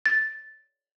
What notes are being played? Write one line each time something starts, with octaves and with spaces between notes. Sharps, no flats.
A6